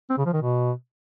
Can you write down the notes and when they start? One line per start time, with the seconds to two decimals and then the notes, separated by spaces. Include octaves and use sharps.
0.10 C4
0.18 C#3
0.26 F3
0.33 D#3
0.41 B2